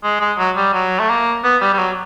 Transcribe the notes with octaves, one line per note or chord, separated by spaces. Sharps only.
G#3
G#3
F#3
G3
F#3
A3
A#3
B3
G3
G3
F#3